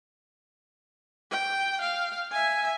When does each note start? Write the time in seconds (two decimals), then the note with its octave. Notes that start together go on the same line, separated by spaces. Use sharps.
1.31 G5
1.82 F5
2.32 E5 G#5